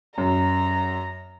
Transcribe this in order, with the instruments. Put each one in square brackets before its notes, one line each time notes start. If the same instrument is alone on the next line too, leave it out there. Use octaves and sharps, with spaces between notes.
[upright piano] F#2 [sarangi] A#5